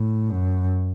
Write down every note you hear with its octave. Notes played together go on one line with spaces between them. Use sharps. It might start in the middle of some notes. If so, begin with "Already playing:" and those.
Already playing: A2
F#2